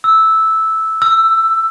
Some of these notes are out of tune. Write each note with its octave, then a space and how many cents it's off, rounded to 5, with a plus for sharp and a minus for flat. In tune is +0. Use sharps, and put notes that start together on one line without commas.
E6 -10
E6 +10